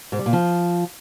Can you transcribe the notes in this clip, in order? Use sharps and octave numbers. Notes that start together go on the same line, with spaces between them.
G#2
G3
A#2
F3